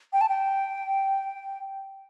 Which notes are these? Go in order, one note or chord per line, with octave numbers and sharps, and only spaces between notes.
G5
A5
G5